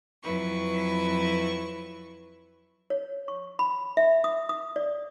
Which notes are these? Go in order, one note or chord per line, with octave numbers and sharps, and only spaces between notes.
F2 F#3 E4 B4 C#6
C#5
C#6
B5
E5
D#6
D#6
D5